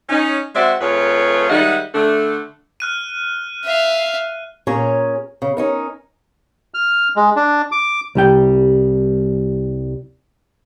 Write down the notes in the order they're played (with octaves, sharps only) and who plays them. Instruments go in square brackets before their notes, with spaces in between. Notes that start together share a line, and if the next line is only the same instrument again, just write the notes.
[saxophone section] C#4 D#4
G#3 C4 F#4 D5 E5
F2 A3 F4 G#4 B4 C#5
D#3 G3 G#3 D#4 E5 F#5
D3 A3 D4
[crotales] F6 F#6 D#7
[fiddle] E5 F5
[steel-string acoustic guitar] A#2 C#4 G#4 A#4 C#5 A#5
C#3
C#4 D#4 A#4
[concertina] F6
G#3
D4
D6
[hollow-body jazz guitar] C2 G3 G5